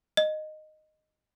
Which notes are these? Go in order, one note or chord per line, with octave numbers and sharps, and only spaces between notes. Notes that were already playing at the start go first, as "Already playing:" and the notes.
D#5